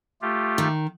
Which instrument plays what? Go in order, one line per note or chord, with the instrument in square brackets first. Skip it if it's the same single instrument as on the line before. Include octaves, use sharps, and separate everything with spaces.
[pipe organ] A3 F4 G4
[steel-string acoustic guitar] D#3